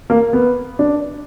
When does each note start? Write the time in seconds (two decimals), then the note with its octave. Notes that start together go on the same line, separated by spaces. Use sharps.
0.10 A#3
0.33 B3
0.79 D4